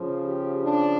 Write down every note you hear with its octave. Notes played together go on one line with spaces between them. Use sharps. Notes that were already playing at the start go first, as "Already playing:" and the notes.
Already playing: C#3 F3
G4
D4